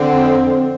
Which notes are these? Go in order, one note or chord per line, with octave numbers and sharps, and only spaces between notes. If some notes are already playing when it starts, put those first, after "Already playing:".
Already playing: D3 C4
F2